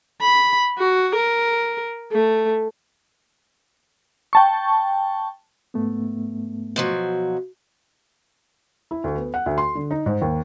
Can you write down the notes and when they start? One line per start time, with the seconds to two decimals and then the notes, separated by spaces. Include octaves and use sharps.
0.22 B5
0.78 F#4
1.15 A#4
2.12 A3
4.33 G5 A5 C#6
5.74 G#2 A3 B3
6.76 B2 F3 F#3
8.91 E4
9.04 D2
9.16 B3
9.34 F#5
9.46 D2
9.58 C6
9.75 D3
9.91 D#4
10.06 G#2
10.22 D#2